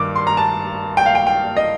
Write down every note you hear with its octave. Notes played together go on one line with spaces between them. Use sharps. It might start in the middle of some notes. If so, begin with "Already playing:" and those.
Already playing: G2 D#3 D6
C6
A#5
A5
G5
F5
G5
G5
D#5